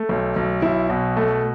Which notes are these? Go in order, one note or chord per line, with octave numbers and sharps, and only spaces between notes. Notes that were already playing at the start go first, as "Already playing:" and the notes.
Already playing: A3
B1
B1
B1 E4
B2
A3